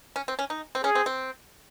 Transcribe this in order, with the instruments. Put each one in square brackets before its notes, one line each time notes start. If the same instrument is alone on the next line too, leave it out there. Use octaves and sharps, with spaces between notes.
[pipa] C#4
C4
C#4
D#4
C4
[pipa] C#4 [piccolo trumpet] G#4
[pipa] C4
C4